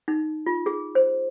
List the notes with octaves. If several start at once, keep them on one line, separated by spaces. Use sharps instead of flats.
D#4
F4
G#4
C5